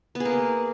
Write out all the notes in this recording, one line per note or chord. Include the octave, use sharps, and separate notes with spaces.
B3
G#4
A#3